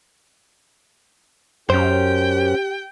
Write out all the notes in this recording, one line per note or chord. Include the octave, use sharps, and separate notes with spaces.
F#2 C#4 G4 C5 G5